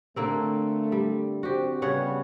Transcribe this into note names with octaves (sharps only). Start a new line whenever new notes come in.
D3 A3 A#3 C4
G3
C4 F#4 G4
C#3 G3 B3 C#5 F#5